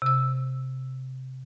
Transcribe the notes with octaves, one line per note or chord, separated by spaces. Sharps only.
C3 E6